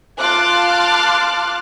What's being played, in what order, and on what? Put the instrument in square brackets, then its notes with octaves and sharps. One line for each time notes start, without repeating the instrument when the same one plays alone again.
[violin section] F4 A5 C6 D6 F6 F#6